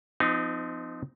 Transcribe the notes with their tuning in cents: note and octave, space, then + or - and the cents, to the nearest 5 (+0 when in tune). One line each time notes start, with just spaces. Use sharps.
F3 -10 C4 -40 D#4 +0